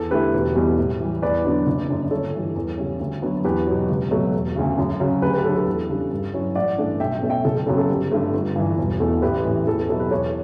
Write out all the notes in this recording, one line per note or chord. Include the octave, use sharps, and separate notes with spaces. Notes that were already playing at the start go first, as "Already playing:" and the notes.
Already playing: E2 A4
D3 A3 E4 G4 B4
E1
E2 B2 G3
A2
E3 G3
E2 B4 D5
D3 F#3 B3 D4
F#1
F#2 D3
G1 A4 C#5
G2 E3 G3
E2
C#3 E3 G3 C#4
D2
D3 F#3 B3
E2 G4 B4
B2 F#3
C#2
B2 F#3 A3
E1
D2 C#3
F#2
C#3 F#3
D2 G4 B4
G4 B4
D3 F#3 A4
A4
E2
C#3 G3 D4
G2
F#3 C#4 E4
A1 D5 F#5
G2 E3 A3 D4
B1 E5 G5
E5 G5
B2 A3 C#4
E5 G5
F#1 A4
A4
F#2 C#3 F#3 B3 A4
A4
G1 G4
G2 D3 A3
G1
G2 E3
E1
E2 B2 A3 A4
A1 G4 B4
A2 E3
E2 A4
A4
B2 F#3 B3 E4 A4
G4 B4
E2 A4 C#5